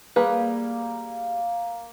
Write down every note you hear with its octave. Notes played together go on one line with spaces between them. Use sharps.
G3 A#3 G#4 B4